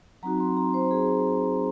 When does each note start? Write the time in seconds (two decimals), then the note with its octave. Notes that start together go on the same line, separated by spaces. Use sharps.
0.23 F#3 C4 D#4 F#4 A#5
0.40 C6
0.57 A#5
0.74 C5
0.91 G#4